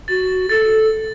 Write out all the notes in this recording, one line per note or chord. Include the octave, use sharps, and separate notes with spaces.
F#4 A6
A4 A6